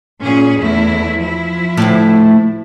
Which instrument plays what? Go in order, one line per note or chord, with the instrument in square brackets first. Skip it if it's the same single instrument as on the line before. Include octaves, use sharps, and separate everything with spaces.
[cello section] A#2 C#4 G#4
E2 A3 E4
F3 E4
[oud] D2 A2